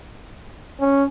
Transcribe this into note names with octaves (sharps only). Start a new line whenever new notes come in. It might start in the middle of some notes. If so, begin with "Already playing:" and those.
C#4